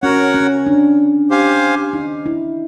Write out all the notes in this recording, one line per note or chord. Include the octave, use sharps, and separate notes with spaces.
C#4 F#4 A#4 C#5 F#5
C#4
D4
G4 C5 F5 G#5
D#4
E4